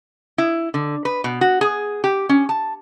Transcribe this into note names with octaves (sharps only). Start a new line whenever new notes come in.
E4
D3
B4
B2
F#4
G#4
G4
C#4
A5